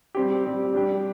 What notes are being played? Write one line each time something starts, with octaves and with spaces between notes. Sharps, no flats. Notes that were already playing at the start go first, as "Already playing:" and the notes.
G3 C4 G4
G3 C4 G4
G3 D4 G4